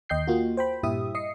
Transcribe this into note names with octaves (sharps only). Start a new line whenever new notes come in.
D#2 D#5 G5 G6 C7
A#3 F4 F#4
C5 G5 B5
G2 A#2 E4 G4 E5 D#6
D#5 D#6 C7 C#7